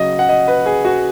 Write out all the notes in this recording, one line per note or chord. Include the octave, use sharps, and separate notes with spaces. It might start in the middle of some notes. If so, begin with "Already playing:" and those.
Already playing: C#3 F#3 D#5
F#5
D#5
B4
G#4
F#4